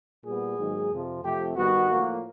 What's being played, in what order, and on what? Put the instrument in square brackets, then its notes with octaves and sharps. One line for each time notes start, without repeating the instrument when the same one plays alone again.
[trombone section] A#2 G3 B3 G#4
G#2 D#3 F#3 A#3
F2 C3 F3
F2 C3 F3 A3 G4
G2 D#3 G3 B3 F#4
A2 F3 A#3